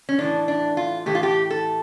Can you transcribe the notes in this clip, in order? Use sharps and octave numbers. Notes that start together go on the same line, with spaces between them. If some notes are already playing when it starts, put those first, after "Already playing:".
C#4
A2 E3 A3 D4
D4
F4
A2 E3 A3 G4
F4
G4
A4